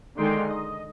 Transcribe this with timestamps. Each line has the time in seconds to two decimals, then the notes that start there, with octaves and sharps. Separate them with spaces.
0.18 D3 D#3 G#3 D#4 G5 C6
0.49 D#5